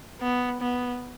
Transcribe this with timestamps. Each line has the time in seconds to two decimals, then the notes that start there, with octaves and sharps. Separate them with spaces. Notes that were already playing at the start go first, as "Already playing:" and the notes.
0.21 B3
0.61 B3